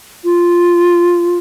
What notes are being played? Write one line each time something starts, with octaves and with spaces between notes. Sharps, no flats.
F4